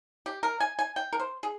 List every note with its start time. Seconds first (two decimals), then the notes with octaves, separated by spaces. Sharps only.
0.26 G4
0.43 A#4
0.60 G#5
0.79 G#5
0.96 G5
1.13 A#4
1.20 C5
1.43 G#4